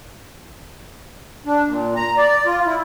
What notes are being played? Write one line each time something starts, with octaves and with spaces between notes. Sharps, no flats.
D4
A#2
A#5
D5
F4
E4